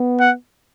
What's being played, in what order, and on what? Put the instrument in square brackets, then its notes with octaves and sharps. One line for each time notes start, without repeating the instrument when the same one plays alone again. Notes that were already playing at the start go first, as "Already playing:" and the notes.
Already playing: [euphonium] B3
[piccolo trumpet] F#5